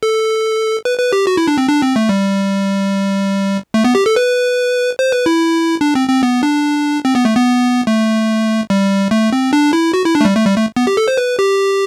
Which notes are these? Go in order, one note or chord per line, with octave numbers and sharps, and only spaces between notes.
A4
B4
B4
G4
F#4
E4
D4
C4
D4
C4
A3
G3
A3
B3
G4
A4
B4
C5
B4
E4
D4
C4
C4
B3
D4
C4
B3
A3
B3
A3
G3
A3
C4
D4
E4
F#4
E4
D4
A3
G3
A3
G3
A3
B3
G4
A4
C5
B4
G4